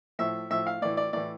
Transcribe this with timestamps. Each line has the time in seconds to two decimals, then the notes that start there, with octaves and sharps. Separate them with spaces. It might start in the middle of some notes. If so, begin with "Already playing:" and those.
0.19 A2 F3 E5
0.50 A2 F3 E5
0.67 F5
0.81 A2 E3 D5
0.97 D5
1.13 A2 E3 D5